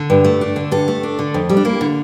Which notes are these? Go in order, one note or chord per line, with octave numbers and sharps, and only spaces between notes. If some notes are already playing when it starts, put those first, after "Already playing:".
Already playing: D3
G2
A3
D4
D3
G2 A4
A3
D4
D3
F2
G3
D4
A#3 E4
D3